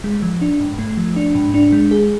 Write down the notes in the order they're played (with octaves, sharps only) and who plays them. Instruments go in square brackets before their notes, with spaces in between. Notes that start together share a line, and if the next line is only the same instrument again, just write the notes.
[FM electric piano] G#3
F3
D4
G#2
A3
F3
D4
G#2
D4
G#3
G#4